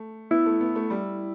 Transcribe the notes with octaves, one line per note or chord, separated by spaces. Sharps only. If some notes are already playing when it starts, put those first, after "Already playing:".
Already playing: A3
B3 E4
A3
B3
A3
G3